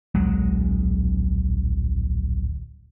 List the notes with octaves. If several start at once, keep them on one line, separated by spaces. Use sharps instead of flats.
D1 A#1 F#3 G#3